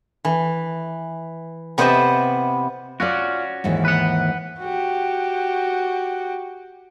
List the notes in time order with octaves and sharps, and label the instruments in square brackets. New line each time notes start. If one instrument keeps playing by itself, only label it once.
[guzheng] E3
C3 B3 E4 C5 D#5 A5
[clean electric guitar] C#4 F#4 [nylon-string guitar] F4 D5
[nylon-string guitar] D#2 G#2 E3
[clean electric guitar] B4 F#5
[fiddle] F#4 G4